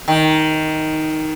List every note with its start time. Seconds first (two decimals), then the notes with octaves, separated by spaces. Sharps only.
0.08 D#3